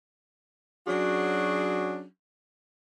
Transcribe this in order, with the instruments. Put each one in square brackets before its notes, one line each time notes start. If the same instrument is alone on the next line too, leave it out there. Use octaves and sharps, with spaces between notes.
[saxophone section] F#3 C#4 D4 F#4 G#4